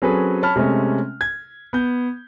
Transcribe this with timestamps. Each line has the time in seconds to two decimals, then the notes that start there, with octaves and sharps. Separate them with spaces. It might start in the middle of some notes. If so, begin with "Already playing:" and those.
0.02 F#3 C4 C#4 G#4 A4 B4
0.43 C#5 A5 B5 F6
0.56 C3 G#3 A3 C#4
1.21 G#6
1.73 B3 G6